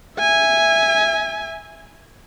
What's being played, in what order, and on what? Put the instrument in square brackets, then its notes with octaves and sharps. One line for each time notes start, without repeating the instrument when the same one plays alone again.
[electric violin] E5 G#5